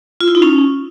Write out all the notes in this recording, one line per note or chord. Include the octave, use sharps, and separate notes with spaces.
F4
E4
D#4
C#4